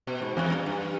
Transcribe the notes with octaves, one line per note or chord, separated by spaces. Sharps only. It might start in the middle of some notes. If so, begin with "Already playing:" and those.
B2
G#2
E2
G2
G2